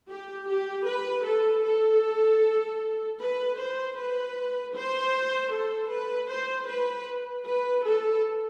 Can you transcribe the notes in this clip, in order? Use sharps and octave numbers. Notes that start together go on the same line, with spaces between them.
G4
G4
B4
A4
A4
B4
C5
B4
C5
A4
B4
C5
B4
B4
A4